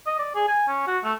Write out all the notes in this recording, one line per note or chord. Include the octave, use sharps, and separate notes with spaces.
D#5
D5
G#4
G#5
C#4
F#4
A3